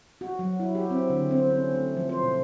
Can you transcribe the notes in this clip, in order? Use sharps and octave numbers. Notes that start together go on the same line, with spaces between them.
F#4
F#3
E4
G4
C4
D3
C4
C#4
A3
F3
C5
B2